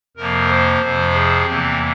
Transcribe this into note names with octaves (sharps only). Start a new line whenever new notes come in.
F2 C3 F3 A#3 A#4
C5
F2 C3 F3
G#4
E2 C3 E3 A#3 C4